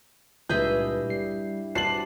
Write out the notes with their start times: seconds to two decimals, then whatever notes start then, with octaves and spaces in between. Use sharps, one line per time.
0.49 C#2 G2 A#2 E4 G#4 D#5 E5 G6
1.10 G3 C7
1.75 F#4 C5 D5 A5 C7 F#7